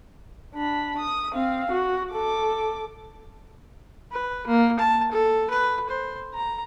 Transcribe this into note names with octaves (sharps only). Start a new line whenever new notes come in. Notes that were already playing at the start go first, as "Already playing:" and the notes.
D4 B5
D#6
C4 F5
F#4
A4 D6
B4
A#3
A5
A4
B4
C5
A#5